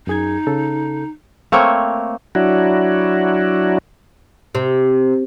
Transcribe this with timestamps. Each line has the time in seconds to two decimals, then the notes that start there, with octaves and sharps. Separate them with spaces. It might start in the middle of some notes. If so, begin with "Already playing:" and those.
0.07 F#2 D#4 G#4 G#6
0.47 C#3 A4
1.52 A3 A#3 C4 C#5
2.35 F#3 D4 E4 F#4
4.55 C3